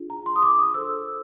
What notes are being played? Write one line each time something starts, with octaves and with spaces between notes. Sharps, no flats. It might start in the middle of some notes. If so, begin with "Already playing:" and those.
Already playing: D4 F4 G#4
A#5
C6
D#6
D6
D#6
F4 A4 C5 E6